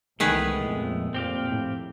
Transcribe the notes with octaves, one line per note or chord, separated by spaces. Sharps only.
C2 D#3 E3 G#3 A3 B3 G#4 B4
F2 A#2
F2 A#2 C4 G4 F5
A2